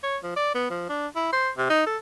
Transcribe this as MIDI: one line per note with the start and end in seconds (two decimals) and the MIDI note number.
0.03 0.17 73
0.23 0.36 53
0.36 0.52 74
0.55 0.69 59
0.70 0.88 53
0.89 1.07 62
1.15 1.30 64
1.32 1.50 72
1.58 1.67 48
1.70 1.86 63
1.86 1.97 69